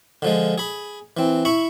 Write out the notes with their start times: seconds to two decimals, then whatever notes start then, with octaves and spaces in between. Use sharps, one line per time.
0.22 D3 F3 G#3
0.58 G#4 B5
1.17 E3 C4
1.45 E4 B5 C#6